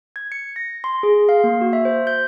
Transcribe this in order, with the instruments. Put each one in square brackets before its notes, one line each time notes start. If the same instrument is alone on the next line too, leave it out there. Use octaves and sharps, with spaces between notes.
[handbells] G#6
C#7
A#6
C6
G#4
F5
A#3
F#4
E5
C5
G6